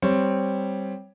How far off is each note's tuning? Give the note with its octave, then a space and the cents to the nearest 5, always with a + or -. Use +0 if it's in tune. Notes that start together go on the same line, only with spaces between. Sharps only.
G3 +0 C4 +0 C#5 +0